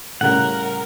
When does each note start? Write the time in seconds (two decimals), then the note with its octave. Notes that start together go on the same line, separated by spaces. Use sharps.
0.21 A2 C#3 G3 A#4 F#5